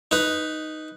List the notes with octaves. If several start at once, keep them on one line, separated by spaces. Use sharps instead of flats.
D#4 B4